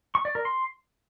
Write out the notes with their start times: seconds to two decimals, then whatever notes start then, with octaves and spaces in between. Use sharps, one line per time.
0.15 C#6
0.25 D5
0.35 A#4
0.45 C6